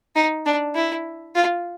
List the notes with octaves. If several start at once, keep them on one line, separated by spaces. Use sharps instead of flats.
D#4
D4
E4
F4